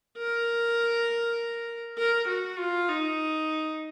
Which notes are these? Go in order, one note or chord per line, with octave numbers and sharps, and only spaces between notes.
A#4
A#4
F#4
F4
D#4